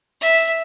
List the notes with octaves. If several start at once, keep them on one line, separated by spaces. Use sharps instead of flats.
E5